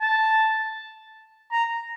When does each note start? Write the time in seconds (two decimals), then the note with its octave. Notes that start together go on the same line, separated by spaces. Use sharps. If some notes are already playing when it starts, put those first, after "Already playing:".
0.01 A5
1.52 A#5